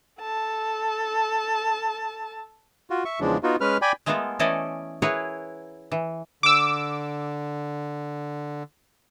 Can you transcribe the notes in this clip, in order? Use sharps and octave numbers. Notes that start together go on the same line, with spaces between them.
A4 A5
F4 F#4
E5 C#6
E2 C#3 F3 G#3 D4
B3 D#4 F4 F#4
G#3 C#4 B4 F6
D5 G5 G#5 B5
G#3 A3 B3 F4 A4 A#4
E3 A3 C#4 A4 D5 D#5
E4 G#4 A#4 B4 C#5 F#5
E3
D3 D6 E6